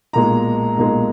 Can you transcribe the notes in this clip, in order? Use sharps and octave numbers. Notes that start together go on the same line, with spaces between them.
B1 A#2 G#3 A#5
B1 A#2 G#3